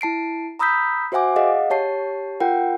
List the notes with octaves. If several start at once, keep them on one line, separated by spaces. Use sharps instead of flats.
E4 A5 C7 D7
A#5 B5 D#6 E6 G6 B6
F#4 C5 E5 F#5 G#5 D6
G#4 D#5 F5 F#5
G4 C#5 A5 C7
F4 A#4 F#5 G5